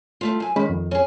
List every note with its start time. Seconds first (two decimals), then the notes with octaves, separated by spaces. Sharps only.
0.21 G3 A3 F4
0.40 F#2 G#5
0.56 D#3 G#3 C#4 B5
0.70 F2
0.91 C#4 G#4